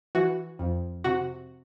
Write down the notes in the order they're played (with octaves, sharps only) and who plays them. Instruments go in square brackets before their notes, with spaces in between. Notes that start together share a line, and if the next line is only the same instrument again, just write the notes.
[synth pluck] E3 F#4
F2
C3 F#4